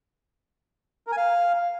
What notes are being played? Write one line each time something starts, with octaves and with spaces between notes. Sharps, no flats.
A#4
G#5
F5